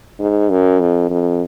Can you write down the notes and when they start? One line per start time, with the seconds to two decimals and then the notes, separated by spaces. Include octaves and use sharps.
0.20 G#2
0.50 F#2
0.81 F2
1.10 F2